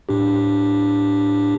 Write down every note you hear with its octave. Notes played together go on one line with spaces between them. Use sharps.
A2 D4 G4